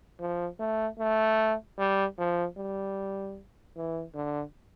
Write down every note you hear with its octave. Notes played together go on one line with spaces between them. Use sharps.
F3
A3
A3
G3
F3
G3
E3
D3